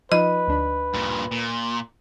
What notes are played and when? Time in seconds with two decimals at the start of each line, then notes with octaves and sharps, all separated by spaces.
0.12 F3 D#4 F4 B4 D#5
0.48 D2 D4 B5
0.94 G2 A#2
1.31 A#2